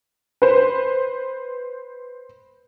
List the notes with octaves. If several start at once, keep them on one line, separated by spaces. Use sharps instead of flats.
B4 C5